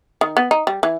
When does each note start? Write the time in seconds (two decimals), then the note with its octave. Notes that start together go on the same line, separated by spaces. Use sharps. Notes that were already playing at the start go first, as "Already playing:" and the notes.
0.21 D#3
0.37 B3
0.51 D#4
0.67 G3
0.83 E3